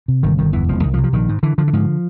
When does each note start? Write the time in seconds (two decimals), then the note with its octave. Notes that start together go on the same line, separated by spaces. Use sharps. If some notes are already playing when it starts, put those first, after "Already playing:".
0.08 C3
0.23 G1 D#3
0.38 G1 D#3
0.53 E2 E3
0.68 E1 F3
0.83 C2 D#3
0.94 F3
0.98 C3
1.04 F3
1.13 A#1 D#3
1.29 G#2
1.43 D3 E3
1.58 D3 F3
1.68 E3
1.73 G#2 F3